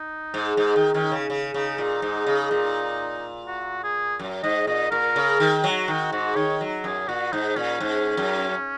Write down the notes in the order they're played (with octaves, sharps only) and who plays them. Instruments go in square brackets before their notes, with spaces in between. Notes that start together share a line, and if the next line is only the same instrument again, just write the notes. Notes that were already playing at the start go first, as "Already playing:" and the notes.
Already playing: [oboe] D#4
[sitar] G#2
[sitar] G#2 [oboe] D#4
[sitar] D#3
[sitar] D#3 [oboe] C#4
[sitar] C#3
C#3
[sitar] C#3 [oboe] D#4
[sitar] A#2 [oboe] D#4
[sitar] G#2
C#3
A#2
[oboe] F#4
G#4
[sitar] F#2
[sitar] G#2 [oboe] D#5
[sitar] A#2 [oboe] D#5
[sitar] A#2 [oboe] A#4
[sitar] C#3
D#3
[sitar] F#3 [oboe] F#4
[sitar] D#3 [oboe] F#4
[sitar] G#2 [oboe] F#4
[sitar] D#3 [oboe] C#5
[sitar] F#3
[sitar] F#2 [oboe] G#4
[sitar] A#2 [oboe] F#4
[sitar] G#2 [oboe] D#4
[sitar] A#2 [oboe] C#4
[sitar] G#2
F#2